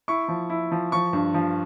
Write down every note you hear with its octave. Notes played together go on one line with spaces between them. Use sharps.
E4 C#6
F3
E4
F3
F3 C#6
G2
F3